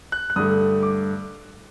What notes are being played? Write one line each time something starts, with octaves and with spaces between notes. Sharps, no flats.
F#6
F#6
G2 D3 A3 D#6
D6